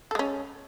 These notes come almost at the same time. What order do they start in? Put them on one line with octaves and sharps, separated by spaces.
A4 G#3 C#4